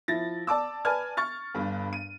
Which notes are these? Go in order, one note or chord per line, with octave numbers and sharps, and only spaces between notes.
F3 E4 A6 A#6
D5 A5 D6 E6
B4 D5 G#5 A5 F6 G#6
C#6 F6 A6
G1 G2
D#7